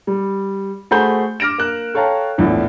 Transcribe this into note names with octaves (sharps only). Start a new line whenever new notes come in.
G3
A3 F#4 G#4 C5 B5 G6
D6 F6 A#6 D7 E7
A#3 F#6
A4 C#5 F5 G5 A5 A#5
A#1 E2 A2